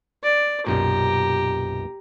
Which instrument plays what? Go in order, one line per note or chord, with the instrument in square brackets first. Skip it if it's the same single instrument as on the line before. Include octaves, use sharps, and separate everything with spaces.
[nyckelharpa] D5
[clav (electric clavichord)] B1 F#2 A#2 [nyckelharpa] G4 A#5